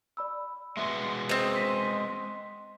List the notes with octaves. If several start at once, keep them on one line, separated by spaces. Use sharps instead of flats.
D5 B5 E6
G#3 B3 F#4 E5 F#5 C6
C4 G#4 D#5
B6